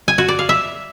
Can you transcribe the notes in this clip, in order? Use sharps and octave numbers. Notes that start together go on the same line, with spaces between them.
G#5
F#4
D5
F5
E5